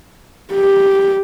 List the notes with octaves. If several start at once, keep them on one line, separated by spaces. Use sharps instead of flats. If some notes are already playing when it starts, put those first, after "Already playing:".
G4